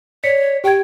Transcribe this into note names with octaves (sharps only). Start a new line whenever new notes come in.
C#5 D5 B6 C#7
G4 G5 G#6